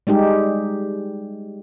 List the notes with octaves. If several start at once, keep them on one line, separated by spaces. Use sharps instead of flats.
G3 G#3 D#4 G4